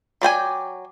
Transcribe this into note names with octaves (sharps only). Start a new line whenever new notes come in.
F#3 D5 G5 G#5